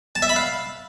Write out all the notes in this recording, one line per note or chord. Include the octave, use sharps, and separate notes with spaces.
A5
E5
B5
F5